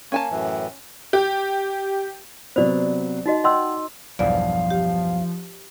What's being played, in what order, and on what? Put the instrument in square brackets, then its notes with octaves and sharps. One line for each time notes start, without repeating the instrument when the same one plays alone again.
[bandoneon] A#3 [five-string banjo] C#4 G#5 A5
[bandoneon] F#2 A2 E3
[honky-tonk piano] G4
[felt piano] C3 F#3 B3 [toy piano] C5 D5
[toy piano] D#4 F#4 D#5
[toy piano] D#5 C6 E6 [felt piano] F#5 G5
[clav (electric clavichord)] B1 E2 G2 [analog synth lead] F3 [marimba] D5 [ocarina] F5
[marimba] G4